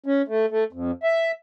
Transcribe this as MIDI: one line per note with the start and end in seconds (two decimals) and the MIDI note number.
0.06 0.22 61
0.28 0.46 57
0.50 0.64 57
0.73 0.91 41
1.03 1.31 76